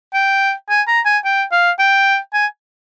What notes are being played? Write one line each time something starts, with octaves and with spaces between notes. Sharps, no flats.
G5
G#5
A#5
G#5
G5
F5
G5
G#5